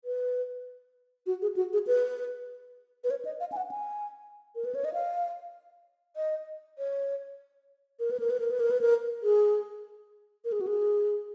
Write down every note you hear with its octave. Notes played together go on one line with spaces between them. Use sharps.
B4
F#4
G#4
F#4
G#4
B4
B4
C#5
D#5
F5
G#5
F#5
G#5
A#4
B4
C#5
D#5
F5
D#5
C#5
A#4
B4
A#4
B4
A#4
B4
A#4
B4
A#4
G#4
A#4
G#4
F#4
G#4